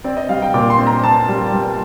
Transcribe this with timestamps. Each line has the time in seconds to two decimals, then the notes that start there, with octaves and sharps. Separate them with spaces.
0.04 C4 D5
0.17 D#5
0.29 G3 F5
0.42 G5
0.54 A#2 D6
0.70 C6
0.79 C4
0.87 A#5
1.03 C4 A5
1.28 G3
1.53 G3